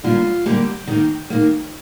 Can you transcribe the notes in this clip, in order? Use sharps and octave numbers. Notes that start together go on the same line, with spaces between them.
D3 G3 A#3 F4
D3 G3 A#3 G4
D#3 A#3
D#3 A#3